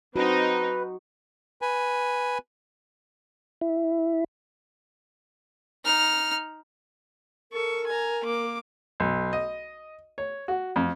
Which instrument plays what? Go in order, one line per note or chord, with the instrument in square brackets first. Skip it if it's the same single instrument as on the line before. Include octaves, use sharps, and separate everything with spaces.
[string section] C4 D#4 [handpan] F#4 [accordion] B4
[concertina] B4 G#5
[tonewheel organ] E4
[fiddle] D#4 F6
[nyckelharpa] A4 C#6 [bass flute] A#4
[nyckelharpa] G#5 A#5
A#3 D6
[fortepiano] B1
D#5
C#5
F#4
F2